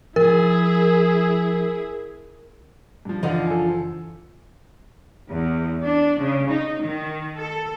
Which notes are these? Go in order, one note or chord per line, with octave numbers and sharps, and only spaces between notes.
F3 E4 G#4 A#4
G2 F3
F#1 D3 E3 F3 D#4 D5 F#5
A4 G#5
E2
D4
C#3
D#4
D#3
A4